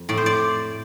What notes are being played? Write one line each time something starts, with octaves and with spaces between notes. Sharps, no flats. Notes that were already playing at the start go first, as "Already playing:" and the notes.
Already playing: F2
A2 A3 D5
C5
D5